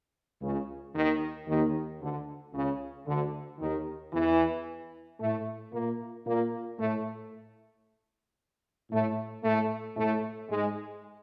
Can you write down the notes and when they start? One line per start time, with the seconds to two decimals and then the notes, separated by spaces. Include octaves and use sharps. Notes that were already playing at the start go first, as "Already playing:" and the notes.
0.40 C#2 C#3
0.93 D#2 D#3
1.47 D#2 D#3
1.99 D2 D3
2.52 C#2 C#3
3.06 D2 D3
3.59 D#2 D#3
4.12 E2 E3
5.18 A2 A3
5.71 A#2 A#3
6.25 A#2 A#3
6.77 A2 A3
8.90 A2 A3
9.43 A2 A3
9.96 A2 A3
10.49 G#2 G#3